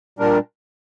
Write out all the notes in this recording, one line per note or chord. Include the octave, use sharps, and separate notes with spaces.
A#2 G3 D4 A#4